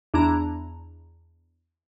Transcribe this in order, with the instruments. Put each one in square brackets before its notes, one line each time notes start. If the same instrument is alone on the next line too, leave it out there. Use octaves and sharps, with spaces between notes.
[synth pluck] E2 D4 E4 A#5